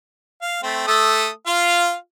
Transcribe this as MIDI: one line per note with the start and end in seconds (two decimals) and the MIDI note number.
0.42 0.62 77
0.63 0.86 57
0.63 0.86 60
0.87 1.29 57
0.87 1.29 69
0.87 1.29 87
1.47 1.95 65
1.47 1.95 77